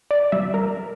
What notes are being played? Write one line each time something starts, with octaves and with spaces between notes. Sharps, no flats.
D5
G3 E5
A#4